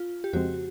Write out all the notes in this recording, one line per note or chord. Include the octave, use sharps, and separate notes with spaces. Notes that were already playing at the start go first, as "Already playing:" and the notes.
Already playing: F4
G4
F2 C#3 F3 G#3 C4 F#4